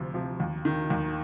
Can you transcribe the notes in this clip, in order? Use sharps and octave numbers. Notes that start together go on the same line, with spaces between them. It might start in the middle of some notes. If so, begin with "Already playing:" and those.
Already playing: D2 C3 F3
C3 F3
D#2
D#3
D#2